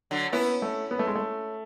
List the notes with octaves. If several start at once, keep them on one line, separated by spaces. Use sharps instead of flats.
D3 F#3
B3 C#4 E4
A3
B3
A3
G#3
A3